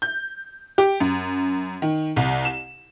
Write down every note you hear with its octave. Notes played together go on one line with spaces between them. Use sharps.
G6
G4
F#2
D#3
C2
E7